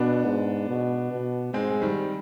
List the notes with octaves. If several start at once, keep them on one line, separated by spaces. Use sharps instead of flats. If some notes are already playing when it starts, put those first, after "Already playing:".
Already playing: B2 B3 D4
G#2
B2
B2
G#2 G#3 C4
G#3
D#3 G3